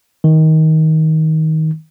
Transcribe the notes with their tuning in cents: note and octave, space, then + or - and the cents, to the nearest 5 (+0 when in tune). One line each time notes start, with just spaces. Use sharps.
D#3 +20